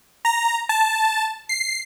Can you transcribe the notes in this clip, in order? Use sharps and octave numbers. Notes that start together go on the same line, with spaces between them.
A#5
A5
C7